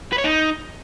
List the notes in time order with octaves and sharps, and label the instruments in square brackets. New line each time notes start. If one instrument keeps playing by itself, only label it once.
[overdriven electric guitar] B4
C#5
D#4